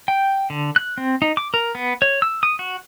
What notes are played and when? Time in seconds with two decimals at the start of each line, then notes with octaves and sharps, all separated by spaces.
0.08 G5
0.50 D3
0.76 F#6
0.98 C4
1.22 D#4
1.37 D6
1.54 A#4
1.75 B3
2.02 C#5
2.22 E6
2.43 D#6
2.59 F#4